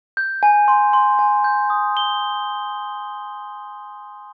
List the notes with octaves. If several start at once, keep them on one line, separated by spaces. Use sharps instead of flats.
G6
G#5
C6
C6
G#5
G6
D#6
G7